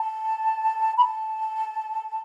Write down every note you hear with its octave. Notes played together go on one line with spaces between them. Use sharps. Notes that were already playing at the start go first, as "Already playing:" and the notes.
Already playing: A5
B5
A5